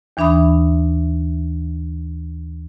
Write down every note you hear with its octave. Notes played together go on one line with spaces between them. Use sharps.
D#2 E3 D4 E5 B5 D#6